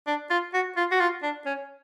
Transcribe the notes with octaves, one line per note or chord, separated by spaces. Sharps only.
D4
F4
F#4
F4
F#4
F4
D4
C#4